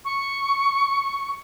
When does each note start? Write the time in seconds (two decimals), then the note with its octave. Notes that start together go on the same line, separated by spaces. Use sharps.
0.05 C#6